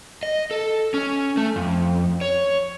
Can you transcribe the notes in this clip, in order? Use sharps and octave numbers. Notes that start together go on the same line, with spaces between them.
D#5
A4
C#4
A3
F2
C#5